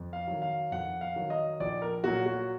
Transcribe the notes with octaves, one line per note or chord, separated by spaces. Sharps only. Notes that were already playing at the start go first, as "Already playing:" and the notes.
Already playing: F2
F5
D#3 F#3
F5
F2 F#5
F5
D#3 F#3
D#5
A#1 D5
A#4
A#2 F#3 F#4
F#4